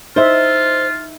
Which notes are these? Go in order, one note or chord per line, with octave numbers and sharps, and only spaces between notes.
D#4 F4 C5 E5